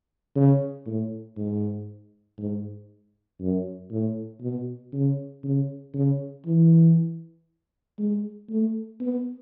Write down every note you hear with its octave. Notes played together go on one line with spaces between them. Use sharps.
C#3
A2
G#2
G#2
F#2
A2
B2
C#3
C#3
C#3
E3
G#3
A3
B3